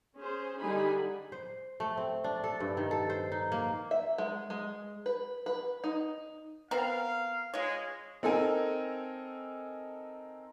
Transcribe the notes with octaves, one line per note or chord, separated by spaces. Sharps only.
C#4 G#4 C5
D3 G3 D#4 G#4 G#5 B5
C5
A3
C4
D4
A4
G2
D#3
A4
C5
D#4
A#3
E5
G#3
G#3
B4
B4
D#4
B3 C4 A#4 F5
G#3 F4 C#5
C4 D#4 A4 A#4 G#5